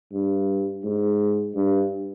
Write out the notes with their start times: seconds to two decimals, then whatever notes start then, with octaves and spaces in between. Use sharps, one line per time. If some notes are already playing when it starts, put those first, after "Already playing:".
0.12 G2
0.83 G#2
1.55 G2